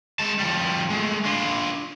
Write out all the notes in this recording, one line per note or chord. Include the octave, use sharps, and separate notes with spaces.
G#3 A5
F3 G3
G#3 A3
D4 F4